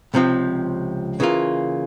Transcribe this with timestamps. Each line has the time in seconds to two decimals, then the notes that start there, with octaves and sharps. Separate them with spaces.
0.14 C#2 C3 F3 C4
1.20 C#3 E3 A#3 F4